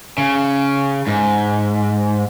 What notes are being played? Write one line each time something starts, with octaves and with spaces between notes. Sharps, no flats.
C#3
G#2